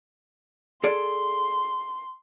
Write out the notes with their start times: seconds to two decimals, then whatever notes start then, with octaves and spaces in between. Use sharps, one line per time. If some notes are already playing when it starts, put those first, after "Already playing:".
0.84 G#4 A4 D5 C6